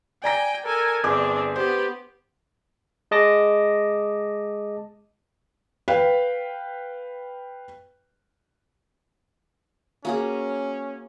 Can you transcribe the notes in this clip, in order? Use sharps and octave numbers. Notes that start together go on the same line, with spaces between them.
D5 G5 G#5 A#5 A#6
A4 A#4 G#5
G1 C4 D4 G#4 D6
B3 G4 C5
G#3 D#5 A5 D6 A#6
B4 F5 G5
A#3 C#4 F#4 G#4